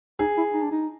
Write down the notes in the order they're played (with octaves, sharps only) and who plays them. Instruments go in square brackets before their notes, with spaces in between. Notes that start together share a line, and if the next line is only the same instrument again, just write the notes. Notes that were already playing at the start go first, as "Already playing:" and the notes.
[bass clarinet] D#4 [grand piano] G#4
[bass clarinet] E4
D#4
D4
D#4